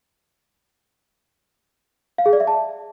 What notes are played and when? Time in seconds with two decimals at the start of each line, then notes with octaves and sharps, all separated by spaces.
2.18 F5
2.26 G#4
2.33 D5
2.40 E5
2.47 A5